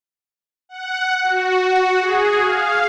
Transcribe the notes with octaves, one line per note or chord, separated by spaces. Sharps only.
F#5
F#4
G#4
F5